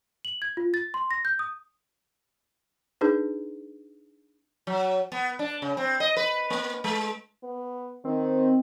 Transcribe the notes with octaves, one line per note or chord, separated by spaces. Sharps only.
F#7
G#6
F4
A6
C6
A#6
G6
D#6
D4 D#4 G#4 B4
F#3
B3
D4
C#3
C4
D#5
B4
A#3
G#3
B3
D#3 C4